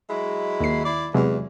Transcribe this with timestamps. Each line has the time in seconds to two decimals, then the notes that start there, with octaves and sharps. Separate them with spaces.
0.10 F#3 G#3 E4
0.60 D#2 C7
0.86 E4 D5
1.14 E2 C3 F#3 G#3